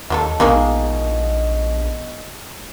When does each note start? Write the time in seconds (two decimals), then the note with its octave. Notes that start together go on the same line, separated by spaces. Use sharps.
0.10 D#2 F#3 F4 A4 D#5
0.40 A#1 B2 D#3 G#3 A#3